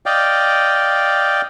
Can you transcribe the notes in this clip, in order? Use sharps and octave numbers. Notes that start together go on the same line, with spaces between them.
D5 D#5 F5 G5